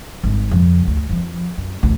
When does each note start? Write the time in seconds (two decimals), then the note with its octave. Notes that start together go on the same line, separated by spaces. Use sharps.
0.23 G#1 G3
0.51 F2 C#3
0.87 D2
1.09 F2 F3
1.58 F#2
1.83 A1 D2